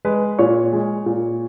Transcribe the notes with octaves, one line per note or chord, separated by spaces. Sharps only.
G#3 B4
A#2 C#5
G#3
A#2